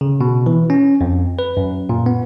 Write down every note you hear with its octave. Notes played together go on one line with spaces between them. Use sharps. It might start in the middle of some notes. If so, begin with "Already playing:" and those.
C#3
B2
E3
C#4
F2
B4
F#2
A#2
B3